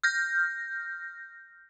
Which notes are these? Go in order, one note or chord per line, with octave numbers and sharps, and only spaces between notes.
F6 G6 A#6